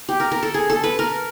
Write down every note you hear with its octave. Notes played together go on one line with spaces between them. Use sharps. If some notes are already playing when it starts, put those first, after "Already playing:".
G4
A#4
A#4
A4
G#4
A4
B4
A#4